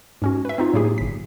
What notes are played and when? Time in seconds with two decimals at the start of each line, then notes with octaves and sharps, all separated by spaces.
0.22 G#2 C#4 F#4
0.45 B4 E5
0.58 C4 D#4 F4
0.73 A2 F#3 A#3 E4 G4 G#4
0.98 G1 B6